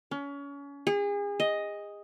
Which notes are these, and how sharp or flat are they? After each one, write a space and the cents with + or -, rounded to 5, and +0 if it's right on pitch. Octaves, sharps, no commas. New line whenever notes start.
C#4 +30
G#4 -35
D#5 +5